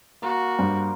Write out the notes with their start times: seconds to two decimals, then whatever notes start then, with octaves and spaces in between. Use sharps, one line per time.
0.22 A#3 F#4
0.59 G2 C5